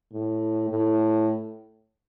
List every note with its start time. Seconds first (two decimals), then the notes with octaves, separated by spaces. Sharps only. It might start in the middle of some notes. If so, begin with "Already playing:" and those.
0.13 A2
0.70 A2